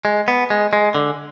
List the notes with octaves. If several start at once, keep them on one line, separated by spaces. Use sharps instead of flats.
G#3
B3
G#3
G#3
D3